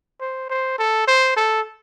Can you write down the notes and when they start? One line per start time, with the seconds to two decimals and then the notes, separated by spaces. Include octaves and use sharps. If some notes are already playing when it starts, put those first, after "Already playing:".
0.21 C5
0.50 C5
0.79 A4
1.08 C5
1.37 A4